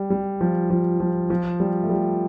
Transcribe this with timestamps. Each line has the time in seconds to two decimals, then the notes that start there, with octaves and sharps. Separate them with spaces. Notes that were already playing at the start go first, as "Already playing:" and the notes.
Already playing: G3
0.10 G3
0.41 F3
0.70 F3
1.00 F3
1.30 F3
1.60 G3
1.83 A3
1.90 G3